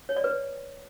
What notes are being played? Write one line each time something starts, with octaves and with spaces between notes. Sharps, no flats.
C#5
D5
B4